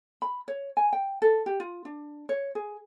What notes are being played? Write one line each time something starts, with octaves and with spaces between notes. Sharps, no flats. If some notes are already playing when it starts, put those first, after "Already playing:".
B5
C#5
G#5
G5
A4
G4
F4
D4
C#5
G#4